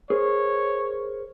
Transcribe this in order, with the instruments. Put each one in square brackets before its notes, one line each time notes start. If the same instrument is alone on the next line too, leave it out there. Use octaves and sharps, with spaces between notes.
[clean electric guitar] G#4 A#4 C5 [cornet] C#5